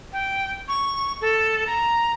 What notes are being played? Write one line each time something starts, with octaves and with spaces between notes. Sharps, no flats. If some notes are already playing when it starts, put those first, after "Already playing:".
G5
C#6
A4
A#5